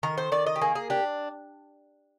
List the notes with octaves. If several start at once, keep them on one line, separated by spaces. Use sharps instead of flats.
D#3 A#4
C5
D#3 D5
D#5
G4
A#3 G#4
G#4
D4 G4